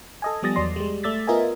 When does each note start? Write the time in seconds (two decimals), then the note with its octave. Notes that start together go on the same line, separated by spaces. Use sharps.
0.22 A4 D#5 G#5
0.43 F3 G3 B3 D#6 A6 A#6
0.56 E2 F#3 D5 C6
0.76 G3 G#3
1.03 A3 D5 E6 A6 B6
1.27 B3 F4 A#4 D#5 E5 G#5